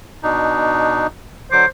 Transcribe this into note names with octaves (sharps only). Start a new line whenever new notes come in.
B2 D4 D#4
D3 F#3 C5 D6